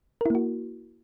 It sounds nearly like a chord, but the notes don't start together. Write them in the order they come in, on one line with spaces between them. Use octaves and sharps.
A#4 E4 A#3 F#4